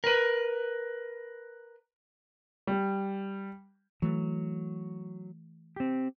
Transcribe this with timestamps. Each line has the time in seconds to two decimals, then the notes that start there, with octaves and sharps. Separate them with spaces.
0.04 A#4 B4
2.67 G3
4.02 E3 F#3 A3
5.76 C4 G4